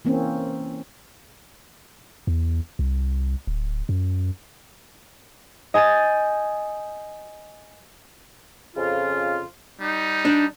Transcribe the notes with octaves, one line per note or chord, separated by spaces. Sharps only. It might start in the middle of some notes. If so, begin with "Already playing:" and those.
E3 A#3 C4 C#4
E2
C2
D1
F#2
D#5 G#5 G6 A6 D#7
F2 C#3 F4
G3 D#4
D4